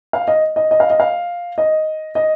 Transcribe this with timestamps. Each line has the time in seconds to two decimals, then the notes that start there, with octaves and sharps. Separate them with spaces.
0.13 F5
0.28 D#5
0.56 D#5
0.71 D#5
0.80 F5
0.90 D#5
1.00 F5
1.58 D#5
2.15 D#5